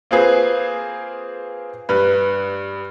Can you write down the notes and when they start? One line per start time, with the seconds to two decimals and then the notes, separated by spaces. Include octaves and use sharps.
0.11 A#3 C4 F4 G#4 B4
1.89 G2 B4